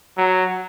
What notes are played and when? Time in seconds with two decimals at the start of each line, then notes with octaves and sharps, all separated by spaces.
0.17 F#3